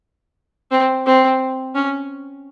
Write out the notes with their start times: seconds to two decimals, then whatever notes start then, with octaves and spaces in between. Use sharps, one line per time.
0.71 C4
1.06 C4
1.75 C#4